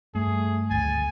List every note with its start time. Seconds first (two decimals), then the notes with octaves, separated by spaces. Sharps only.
0.15 G2 A3 G#4
0.70 G#1 D2 G#5 A6